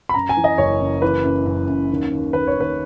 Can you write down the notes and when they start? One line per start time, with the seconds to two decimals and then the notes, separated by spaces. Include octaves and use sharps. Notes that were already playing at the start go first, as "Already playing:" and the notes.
0.09 B5
0.14 F#2 A#5
0.29 G#5
0.37 E3
0.44 D#5
0.58 F#1 C#5
0.80 C#3
1.02 E3 B4
1.24 F#2
1.46 F#2
1.68 F#2
1.90 D#2
2.12 D#2
2.33 D#2 B4
2.47 C#5
2.56 D#2 B4